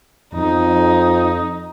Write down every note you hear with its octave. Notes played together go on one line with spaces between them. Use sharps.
F2 D#4